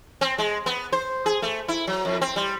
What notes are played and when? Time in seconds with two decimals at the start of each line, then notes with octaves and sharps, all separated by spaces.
0.21 C4
0.38 G#3
0.66 B3
0.92 C5
1.26 G#4
1.42 A3
1.68 E4
1.87 F#3
2.05 F2
2.21 C4
2.36 G3